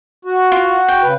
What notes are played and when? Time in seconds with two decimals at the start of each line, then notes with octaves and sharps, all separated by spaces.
0.25 F#4
0.52 F4
0.88 G5
1.03 C#3 B4